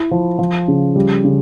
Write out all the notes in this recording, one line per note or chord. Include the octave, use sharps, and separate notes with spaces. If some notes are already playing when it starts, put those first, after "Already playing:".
Already playing: E4
F3
F3
C#3
G3
C#3